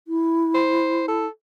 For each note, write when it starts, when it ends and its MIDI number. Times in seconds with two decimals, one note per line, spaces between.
0.08 1.26 64
0.55 1.06 72
1.08 1.28 69